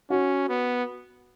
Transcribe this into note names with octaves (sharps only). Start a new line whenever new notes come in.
C#4 F#4
B3